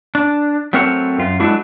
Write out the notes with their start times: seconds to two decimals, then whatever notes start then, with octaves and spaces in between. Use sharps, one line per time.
0.15 D4
0.73 F#3 A3 C4 A#4 C5 C#5
1.18 F#2 F4
1.40 F#3 G#3 A3 D4 E4 F#4